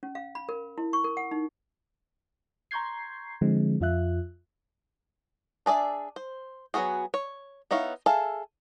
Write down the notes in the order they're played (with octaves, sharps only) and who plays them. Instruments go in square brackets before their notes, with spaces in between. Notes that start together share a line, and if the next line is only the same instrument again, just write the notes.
[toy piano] C#4
F5
B5
A#4
E4
C#6
A#4
F#5
D#4
[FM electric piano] A#5 C6 C#6 G6 G#6 C7
D3 F3 G#3 C4
F2 F4 E5 F#6
[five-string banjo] D4 G#4 D5 E5
C5
F#3 A3 B3 F#4 G#4
C#5
B3 D#4 E4 C#5 F5
G#4 A4 E5 F5